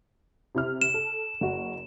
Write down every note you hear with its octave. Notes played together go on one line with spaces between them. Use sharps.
C3 E4 F6
E7
A4
F#1 F#4